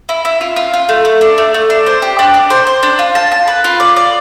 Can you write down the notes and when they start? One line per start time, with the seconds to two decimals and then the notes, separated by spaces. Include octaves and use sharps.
0.09 E4
0.25 E4
0.41 F4
0.56 F4
0.74 F4
0.89 A3
1.05 A3
1.21 D4
1.38 A3
1.54 A3
1.70 D4
1.86 C5
2.02 G4
2.19 D4
2.34 D4
2.50 C5
2.67 C5
2.83 D4
2.99 F4
3.15 A5
3.32 A5
3.48 B4
3.64 F4
3.80 D5
3.96 D5